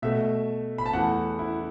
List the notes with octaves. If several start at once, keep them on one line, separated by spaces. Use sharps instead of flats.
B2 A3 E5
B5
A5
E2 E3 A3 F#5
E4